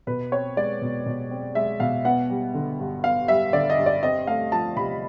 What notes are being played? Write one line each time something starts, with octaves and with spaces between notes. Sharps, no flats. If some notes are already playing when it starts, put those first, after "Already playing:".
B2 B4
C4 C#5
G#3 D5
B2
B2
C4
G#3 E5
B2 F5
B3 F#5
G3
D3
G2
B3 F5
G3 E5
D3 D5
D#5
G2
D5
C4 D#5
A3 F5
F3 A5
C3 B5